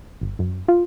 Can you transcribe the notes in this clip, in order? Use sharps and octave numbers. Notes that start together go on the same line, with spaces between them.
G1
F#2
F4